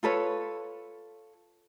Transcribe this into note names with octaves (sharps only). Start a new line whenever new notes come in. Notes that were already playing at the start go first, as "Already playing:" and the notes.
F4 A4 B4 C#5